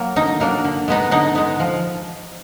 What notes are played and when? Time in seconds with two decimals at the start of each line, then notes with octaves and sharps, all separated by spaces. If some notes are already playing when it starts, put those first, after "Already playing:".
Already playing: F#3 A#3
0.16 D3 D#4
0.40 F#3 A#3 D4
0.64 D3
0.88 G#3 B3 D#4
1.11 D3 D#4
1.35 G#3 B3 D#4
1.60 F3